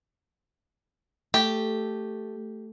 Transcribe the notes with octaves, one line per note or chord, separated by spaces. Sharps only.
A3 G4